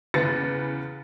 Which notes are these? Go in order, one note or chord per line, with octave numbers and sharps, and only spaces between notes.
E2 C#3 B4 A6 A#6 C#7